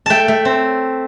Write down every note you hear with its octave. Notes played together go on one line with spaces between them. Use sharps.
A3 G5 A5
A3
C4